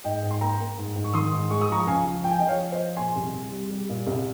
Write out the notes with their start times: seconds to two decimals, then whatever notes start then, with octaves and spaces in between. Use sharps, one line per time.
0.04 G#2 D#5 G5
0.23 G#2
0.31 C6
0.41 A#3 G5 A#5
0.60 A#3
0.78 G#2
0.95 G#2
1.04 C#6
1.13 D#3 C6 D#6
1.32 G#2
1.50 G#3 C#6
1.61 D#6
1.69 F3 A#5 C#6
1.87 C#2 F5 G#5
2.05 F3
2.24 F3 G5
2.31 G#5
2.39 D#5 G5
2.42 F3
2.48 C#5 F5
2.60 F3
2.72 C5 D#5
2.79 F3
2.97 A#2 G#5 C6
3.16 C2
3.33 C2
3.52 G3
3.70 G3
3.89 A#2
4.07 C2